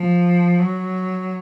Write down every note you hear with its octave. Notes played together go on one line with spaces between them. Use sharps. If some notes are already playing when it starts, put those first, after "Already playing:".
Already playing: F3
F#3